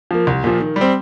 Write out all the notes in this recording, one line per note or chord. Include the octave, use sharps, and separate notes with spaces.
F3 A#3
C2
A#2 F3
D#3
G3
C4